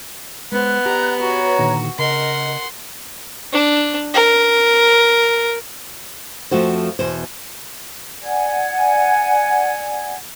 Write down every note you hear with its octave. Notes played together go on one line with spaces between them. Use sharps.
G#3 B3 C5 F#5 F#6
G4 D5 A#5
F#4 B4 C#5 A#5
A#2 D3 D#3
C#3 A#4 D#5 F#5 C6
D4
A#4
F2 F3 A3 F#4 C5
E2 B2 C5
D5 F#5 G#5 G#6